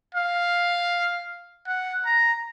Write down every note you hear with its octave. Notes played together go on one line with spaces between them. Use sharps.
F5
F#5
A#5